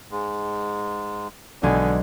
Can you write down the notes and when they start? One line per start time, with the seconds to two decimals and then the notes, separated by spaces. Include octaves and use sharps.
0.11 G#2 G#3
1.63 B1 D3 G#3 G#5